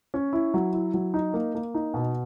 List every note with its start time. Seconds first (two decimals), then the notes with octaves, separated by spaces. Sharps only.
0.14 C#4
0.33 E4
0.54 F#3
0.73 E4
0.94 F#3
1.14 D#4
1.34 A#3
1.55 A#3
1.74 D#4
1.94 B2